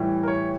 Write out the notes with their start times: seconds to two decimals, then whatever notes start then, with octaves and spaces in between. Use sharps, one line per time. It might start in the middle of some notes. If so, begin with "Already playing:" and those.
Already playing: A2 E3 G3
0.23 A#4
0.28 C#5